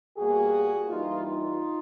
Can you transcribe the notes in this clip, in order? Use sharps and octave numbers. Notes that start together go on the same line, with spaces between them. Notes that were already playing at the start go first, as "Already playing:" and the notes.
B2 G3 A#3 F#4 G#4
G2 E3 G3 A#3 D#4 F4
D#4 F4